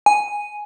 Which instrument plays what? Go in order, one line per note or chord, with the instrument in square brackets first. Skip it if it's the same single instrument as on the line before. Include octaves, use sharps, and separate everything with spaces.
[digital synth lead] G#5